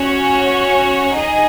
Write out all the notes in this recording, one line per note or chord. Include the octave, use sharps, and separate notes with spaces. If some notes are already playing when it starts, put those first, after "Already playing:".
Already playing: C#4 F#4 C#5
D#4 G#4 D#5 G#5